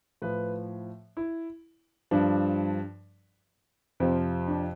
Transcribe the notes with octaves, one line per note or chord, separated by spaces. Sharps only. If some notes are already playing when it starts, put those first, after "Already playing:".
A2 F3 B4
E4
G2 F3 D4
F2 C3 F3 C4
D4